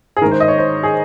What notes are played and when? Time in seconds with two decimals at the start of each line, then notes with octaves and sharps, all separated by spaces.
0.17 G#4
0.21 D#3 A#4
0.25 G#2
0.31 C5
0.40 D#5
0.48 C#5
0.58 C5
0.83 G#4